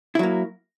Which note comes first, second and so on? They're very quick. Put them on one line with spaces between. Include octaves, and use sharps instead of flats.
E4 F#3 A#3